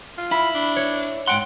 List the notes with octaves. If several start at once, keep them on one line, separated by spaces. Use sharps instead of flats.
F4
E4 B5
D4
C#5
G#2 F#5 G5 C6